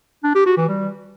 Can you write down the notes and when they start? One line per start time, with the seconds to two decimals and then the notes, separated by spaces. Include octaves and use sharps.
0.24 D4
0.35 G4
0.46 F#4
0.57 E3
0.68 G3